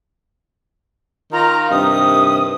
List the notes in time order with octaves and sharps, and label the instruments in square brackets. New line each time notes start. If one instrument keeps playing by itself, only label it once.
[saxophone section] D#3 F4 [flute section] A#5
[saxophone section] G2 C3 D#3 [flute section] D#6